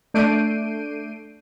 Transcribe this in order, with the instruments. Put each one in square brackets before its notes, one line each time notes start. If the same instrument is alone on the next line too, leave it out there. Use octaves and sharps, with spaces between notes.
[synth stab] A3 D4 G6 C7 D7 D#7